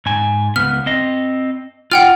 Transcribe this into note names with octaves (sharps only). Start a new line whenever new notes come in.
G#2 G#5
C#2 B3 F6
C4 D#5
F4 F#5 G5 F6